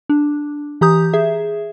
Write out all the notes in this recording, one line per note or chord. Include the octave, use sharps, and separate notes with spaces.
D4
E3 G4 A#5 D#6 G6
G#4 E5